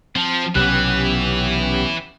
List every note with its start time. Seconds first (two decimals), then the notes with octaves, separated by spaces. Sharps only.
0.16 F3 C4 A5
0.55 B1 C3 E3 B3 C#4 G4 F#6